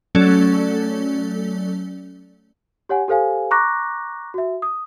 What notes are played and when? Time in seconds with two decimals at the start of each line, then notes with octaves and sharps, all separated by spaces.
0.15 F#3 A3 C#4 A4 D5
2.89 G4 C#5 F#5 G#5
3.08 G4 A4 C5 F5 G#5
3.51 A#5 C#6 D6 F#6 A#6
4.34 F#4 E5
4.62 D#6